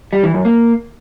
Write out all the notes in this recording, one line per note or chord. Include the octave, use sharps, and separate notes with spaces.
G3
E3
F#2
A#3